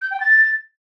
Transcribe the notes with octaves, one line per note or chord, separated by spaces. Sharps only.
G6
G5
A6